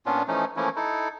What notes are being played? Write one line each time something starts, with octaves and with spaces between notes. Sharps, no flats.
A#2 B3 C#4 D4 F4
E3 F3 A3 C#4 D#4
E3 F3 A3 A#3 C#4 E4
D#4 E4 A4